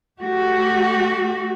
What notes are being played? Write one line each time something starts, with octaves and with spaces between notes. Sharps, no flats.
A3 F#4 G4